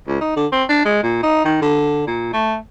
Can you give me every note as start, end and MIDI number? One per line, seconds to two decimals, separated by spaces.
0.08 0.19 37
0.21 0.34 63
0.37 0.46 50
0.52 0.63 60
0.69 0.84 62
0.85 1.03 56
1.03 1.20 46
1.23 1.43 63
1.45 1.57 51
1.62 2.05 50
2.07 2.30 46
2.33 2.56 57